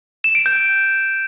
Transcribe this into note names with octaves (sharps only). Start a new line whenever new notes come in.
E7
D7
G6